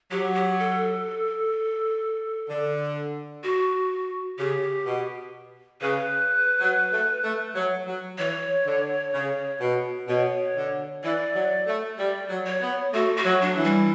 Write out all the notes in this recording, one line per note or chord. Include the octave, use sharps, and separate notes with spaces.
F#3 G4
G4
A4
D3
F#4
C#3 G4
B2
C#3 B4
F#3
A3
A3
F#3
F#3
E3 C#5
D3
C#3
B2
B2 C#5
D3
E3 D5
F#3
A3
G3 D5
F#3
C#5
B3
A3 F#4
F#4
F#3
D4
E3
G3